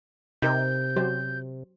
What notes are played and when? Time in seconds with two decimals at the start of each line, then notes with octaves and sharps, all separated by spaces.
0.42 C3 D#4 G4 A#4 G6
0.96 F#3 G4 C5